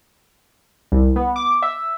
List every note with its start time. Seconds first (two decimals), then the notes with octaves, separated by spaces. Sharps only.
0.92 C2
1.16 B3
1.36 D6
1.62 E5